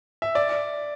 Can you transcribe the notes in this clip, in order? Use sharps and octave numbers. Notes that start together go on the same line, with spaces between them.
E5
D5